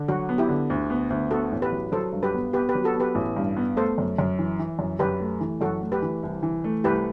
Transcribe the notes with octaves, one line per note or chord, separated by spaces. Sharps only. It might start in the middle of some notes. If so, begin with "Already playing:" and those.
Already playing: D3
F#3 F#4
B3
E4 G4
D3
D2
B3
D2
B3 F#4 A4
A1
G4 B4
F#3
F#3 A4 C5
G2
G4 B4
B3
B3 G4 B4
G4 B4
F#3
F#4 A4
B3
G4 B4
A1
G2
B3
A3 A4 C5
F#2
F#2
E3
E3
F#2
F#2 G4 B4
A3
E3
F#2 F#4 A4
A3
G4 B4
E3
C2
E3
A3
C2 G4 B4